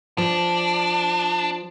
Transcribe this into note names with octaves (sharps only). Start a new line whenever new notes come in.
F3 D4